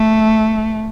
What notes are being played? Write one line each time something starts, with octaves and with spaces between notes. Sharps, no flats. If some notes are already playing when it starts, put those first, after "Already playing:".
Already playing: A3